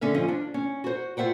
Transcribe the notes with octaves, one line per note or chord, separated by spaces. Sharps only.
D3 C#4 E5 F5
F3 C#4 D#5
D4
C#4
F#4 C5
F4 C5 E5 F#5 G5